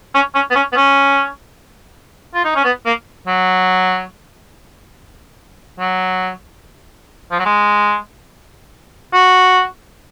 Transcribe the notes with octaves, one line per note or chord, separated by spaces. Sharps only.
C#4
C#4
B3
C#4
B3
C#4
F4
D#4
C#4
B3
A#3
F#3
F#3
F3
F#3
G#3
F#4